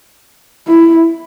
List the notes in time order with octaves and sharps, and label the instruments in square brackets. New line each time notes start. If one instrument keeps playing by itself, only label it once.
[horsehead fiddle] E4